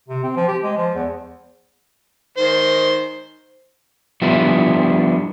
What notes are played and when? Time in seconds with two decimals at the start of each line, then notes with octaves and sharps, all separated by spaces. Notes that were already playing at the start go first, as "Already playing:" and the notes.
0.09 C3
0.23 C4
0.36 F3
0.48 G4
0.63 G#3
0.77 F3
0.95 E2
2.37 D#3 C5
4.22 F3 G3 B3 D4 E4